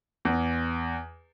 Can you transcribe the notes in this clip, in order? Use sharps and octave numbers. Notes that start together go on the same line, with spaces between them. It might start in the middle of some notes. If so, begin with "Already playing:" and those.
E2